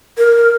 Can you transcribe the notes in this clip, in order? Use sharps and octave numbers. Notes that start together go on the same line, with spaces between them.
A#4